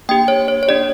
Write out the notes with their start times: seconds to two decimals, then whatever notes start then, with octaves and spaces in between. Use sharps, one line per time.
0.09 A#3 D4 G4 G5
0.28 C#5
0.48 C#5
0.63 C#5
0.68 A#3 D4 G4 D5